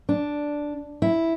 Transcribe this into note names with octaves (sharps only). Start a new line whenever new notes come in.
D4
E4